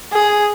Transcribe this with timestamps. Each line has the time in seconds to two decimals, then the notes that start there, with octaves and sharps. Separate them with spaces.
0.12 G#4